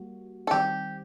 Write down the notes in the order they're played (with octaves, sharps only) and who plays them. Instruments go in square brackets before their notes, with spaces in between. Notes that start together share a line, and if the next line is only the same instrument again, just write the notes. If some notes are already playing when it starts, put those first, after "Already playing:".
Already playing: [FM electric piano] G3 A#3 F#4
[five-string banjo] A4
[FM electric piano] D#3 G3 C4 [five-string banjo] G4